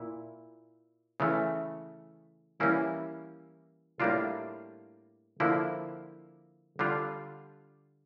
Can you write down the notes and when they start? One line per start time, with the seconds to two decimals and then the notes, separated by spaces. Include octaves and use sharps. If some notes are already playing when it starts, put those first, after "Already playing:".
Already playing: A#2 E4
1.20 C#3 E3 A3
2.60 E3 G3 A#3 C#4 E4
4.00 A2 G3 A#3 D4 F4
5.40 D3 F3 A#3 E4
6.79 D3 G3 D4 F4